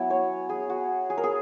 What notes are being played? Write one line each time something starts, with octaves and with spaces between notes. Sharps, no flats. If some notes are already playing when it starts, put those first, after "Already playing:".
Already playing: F#3 B3 E4 F#5 G#5
C#5
G#4
F#4
G#4
A#4
G#4